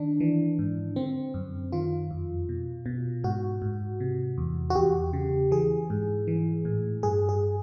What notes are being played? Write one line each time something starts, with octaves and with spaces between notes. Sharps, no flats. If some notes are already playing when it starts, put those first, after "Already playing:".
Already playing: D#3 D4
E3
G#2
D3 C4
F#2
D#3 F4
F2
B2
B2
G#2 F#4
G#2
C3
E2
F#4
E2 G4
C#3
E3 G#4
G#2
E3
A2
G2 G#4
G#4